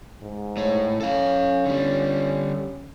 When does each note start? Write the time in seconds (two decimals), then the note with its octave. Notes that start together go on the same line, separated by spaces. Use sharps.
0.22 G#2
0.57 A2 C#5
1.01 C#4 A4 F5
1.65 D3 G3